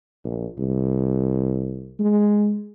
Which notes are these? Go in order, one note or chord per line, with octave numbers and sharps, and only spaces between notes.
A#1
C2
G#3